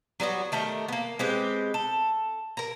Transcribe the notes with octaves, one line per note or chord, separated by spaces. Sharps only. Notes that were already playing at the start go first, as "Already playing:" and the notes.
F#3 G3 B3 F#4
D#3 A3 G4 A#4
A#3 B3
G#3 C4 G4 B4
A4
A#4 A#5